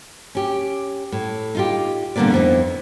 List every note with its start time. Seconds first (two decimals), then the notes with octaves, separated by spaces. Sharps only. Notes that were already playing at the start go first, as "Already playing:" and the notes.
0.35 C#4 G4
1.12 A2
1.55 D#4 F4 G4
2.16 A#2 D3 G3 A#3 B3 D5
2.30 F2 B3 D#4 E4